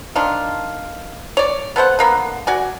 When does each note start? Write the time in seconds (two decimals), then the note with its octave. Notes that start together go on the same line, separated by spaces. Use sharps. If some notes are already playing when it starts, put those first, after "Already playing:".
0.16 D#3 D4 F4
1.37 C#5 D5
1.76 B3 A4 C5 F#5
1.99 D3 A#3 B3
2.47 F#4 D5 G#5